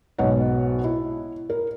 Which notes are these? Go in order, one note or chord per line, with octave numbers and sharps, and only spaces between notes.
B1 G#2 B2 C#5 F#5
E4
A#4